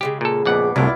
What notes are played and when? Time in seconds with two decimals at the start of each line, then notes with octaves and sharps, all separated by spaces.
0.01 C#3 F3 G#3 G4
0.21 A#2 A4
0.45 A#1 F2 B2 F#5 D6
0.76 C2 F#2 A2 D4 E4 F4